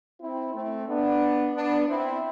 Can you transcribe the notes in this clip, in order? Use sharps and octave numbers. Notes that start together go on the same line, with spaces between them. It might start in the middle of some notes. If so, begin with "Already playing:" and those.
C4 E4
A3 C4
B3 D4
B3 D4
C4 E4